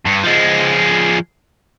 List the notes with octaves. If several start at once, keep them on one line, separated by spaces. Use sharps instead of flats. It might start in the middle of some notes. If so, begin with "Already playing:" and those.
G2
F3 G#3